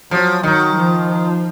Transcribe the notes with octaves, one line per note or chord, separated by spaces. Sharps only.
F3 F#3
D#3 F#3
F3